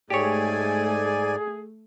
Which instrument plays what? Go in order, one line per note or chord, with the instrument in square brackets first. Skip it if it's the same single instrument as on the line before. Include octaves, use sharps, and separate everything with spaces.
[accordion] G#2 D5 G#5 [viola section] A3 [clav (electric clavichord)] G4 C#5 [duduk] G#4